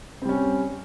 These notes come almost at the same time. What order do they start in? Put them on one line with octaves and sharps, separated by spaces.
C4 G3 C#4